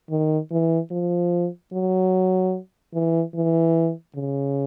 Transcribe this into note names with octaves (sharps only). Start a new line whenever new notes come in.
D#3
E3
F3
F#3
E3
E3
C#3